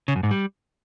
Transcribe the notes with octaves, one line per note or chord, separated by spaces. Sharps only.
C#3
F#2
G#2
G3